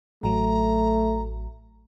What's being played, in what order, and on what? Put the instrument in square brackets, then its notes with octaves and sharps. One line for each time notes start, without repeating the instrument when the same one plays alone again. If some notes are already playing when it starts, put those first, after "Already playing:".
[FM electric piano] A1 F#3 [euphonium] A3 [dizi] A#5